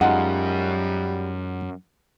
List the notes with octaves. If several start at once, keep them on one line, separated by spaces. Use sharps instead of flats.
F#2 G3 G#3 D#4 F4 F#5